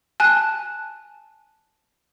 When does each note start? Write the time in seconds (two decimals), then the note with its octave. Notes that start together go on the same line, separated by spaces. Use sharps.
0.20 G#5 A5 F#6